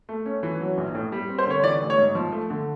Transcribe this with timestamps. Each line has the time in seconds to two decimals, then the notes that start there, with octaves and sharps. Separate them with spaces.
0.09 A3
0.26 C#4
0.43 E3
0.60 F#3
0.78 A#1
0.95 A2
1.12 G3
1.29 C4
1.38 C5
1.46 D3 C#5
1.63 E3 D5
1.81 A1
1.90 C#5
1.98 G#2
2.15 F3
2.32 A3
2.50 D3